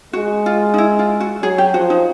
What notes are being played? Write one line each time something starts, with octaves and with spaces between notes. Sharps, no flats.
G#3 F#4
F4
D#4
E4
F4
F#4
F#3 G#4
G4
F3 F#4
D#4